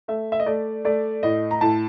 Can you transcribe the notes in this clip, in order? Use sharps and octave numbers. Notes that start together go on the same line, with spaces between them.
A3 E5
E5
D#5
A3 D5
A3 D5
A2 D#5
A#5
A2 A5